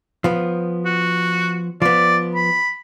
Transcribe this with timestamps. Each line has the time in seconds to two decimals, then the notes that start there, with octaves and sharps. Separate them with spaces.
0.24 F3 B3
0.85 F#4
1.82 F3 B3 D5
2.34 B5